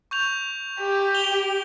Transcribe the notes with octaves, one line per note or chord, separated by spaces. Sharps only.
C#6 G6 F7
G4
F7 G7